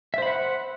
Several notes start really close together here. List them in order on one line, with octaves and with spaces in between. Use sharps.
E5 C5 B5 F#5